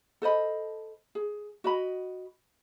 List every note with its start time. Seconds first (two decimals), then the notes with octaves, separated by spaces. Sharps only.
0.22 A4 C5 D#5 B5
1.15 G#4
1.64 F#4 D#5 B5